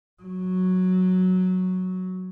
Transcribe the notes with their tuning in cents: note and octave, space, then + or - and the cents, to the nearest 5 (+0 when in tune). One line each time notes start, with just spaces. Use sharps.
F#3 -5